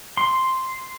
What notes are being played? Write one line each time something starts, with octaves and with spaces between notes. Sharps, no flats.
C6